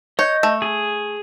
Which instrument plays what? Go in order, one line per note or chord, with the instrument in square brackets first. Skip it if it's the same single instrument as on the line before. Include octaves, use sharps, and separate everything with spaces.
[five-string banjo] C#5 [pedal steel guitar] D#5 G6
[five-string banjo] A3
[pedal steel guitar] G#4